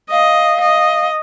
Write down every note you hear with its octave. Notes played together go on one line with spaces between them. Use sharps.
D#5 F5
D#5